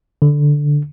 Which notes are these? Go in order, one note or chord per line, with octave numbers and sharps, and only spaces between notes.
D3